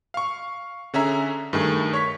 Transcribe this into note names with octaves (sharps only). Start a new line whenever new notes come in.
F5 C#6
D3 C#4 G#4 E5 A#5
G2 D#3 A3 G#4
C#5 C#6 B6